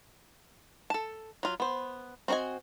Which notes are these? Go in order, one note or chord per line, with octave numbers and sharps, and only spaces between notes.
A4 A5
F#3 F4
B3 C5
C4 F#4 A4 D#5 G#5